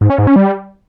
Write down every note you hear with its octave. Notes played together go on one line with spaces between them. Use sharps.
G#2
C#4
G#2
C#4
G3